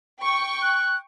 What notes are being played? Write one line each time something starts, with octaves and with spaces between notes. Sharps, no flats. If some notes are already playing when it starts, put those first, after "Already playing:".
G5 C#6
F#6